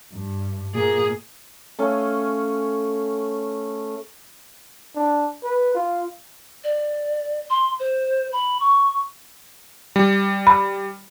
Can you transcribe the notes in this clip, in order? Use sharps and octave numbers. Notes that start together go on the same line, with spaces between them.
G2
A#2 G#4
A3 C#4 F5 G#5
D4
B4
F4
D5
C6
C5
B5
C#6
G3
B5